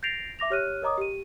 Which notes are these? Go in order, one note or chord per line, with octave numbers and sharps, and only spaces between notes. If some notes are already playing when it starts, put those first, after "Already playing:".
G6 A6 A#6 C7 D7 F7
E5 D6 A#6 F7
G4 C#5 F6 F#6 D#7
A#4 C#5 D#5 A#5 D6 D#6
G4 D#7